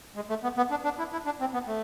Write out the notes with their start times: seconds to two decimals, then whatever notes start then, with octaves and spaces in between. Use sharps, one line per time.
0.16 G#3
0.29 A3
0.43 B3
0.57 B3
0.71 D4
0.84 D4
0.99 E4
1.12 E4
1.25 D4
1.40 C4
1.54 B3
1.67 A3